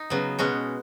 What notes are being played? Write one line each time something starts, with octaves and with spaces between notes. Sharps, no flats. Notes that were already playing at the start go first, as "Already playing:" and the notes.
Already playing: D#4
C#3 F#3 B3
B2 G#3 C#4 F#4